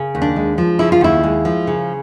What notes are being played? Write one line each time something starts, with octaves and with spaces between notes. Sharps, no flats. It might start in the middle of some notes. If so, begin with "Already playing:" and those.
Already playing: C#3
D#2
D4
G#3
F3
C#3 E4
F4
D#2 E4
G#3
F3
C#3